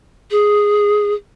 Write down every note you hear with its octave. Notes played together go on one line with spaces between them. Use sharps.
G#4